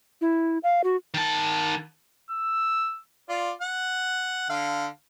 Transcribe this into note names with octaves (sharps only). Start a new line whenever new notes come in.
E4
F5
F#4
D#3 A5
E6
F4 D5
F#5
D3 F5